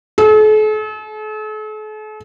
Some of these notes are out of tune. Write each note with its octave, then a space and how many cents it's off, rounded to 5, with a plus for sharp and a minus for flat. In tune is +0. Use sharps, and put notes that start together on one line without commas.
A4 -45